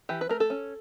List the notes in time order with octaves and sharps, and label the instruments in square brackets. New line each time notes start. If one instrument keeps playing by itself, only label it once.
[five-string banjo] E3 G4
B4
A3 A#4
A4
C#4